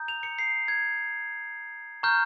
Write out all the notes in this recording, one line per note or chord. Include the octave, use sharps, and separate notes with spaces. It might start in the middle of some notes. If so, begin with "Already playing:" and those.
Already playing: A#5 D#6 G6
F7
C#7
C7
G#6
A#5 C#6 F6 G6